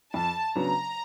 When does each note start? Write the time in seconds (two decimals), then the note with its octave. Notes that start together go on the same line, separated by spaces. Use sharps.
0.14 F2 A5
0.55 C#3 F#3 B3 D4 A#5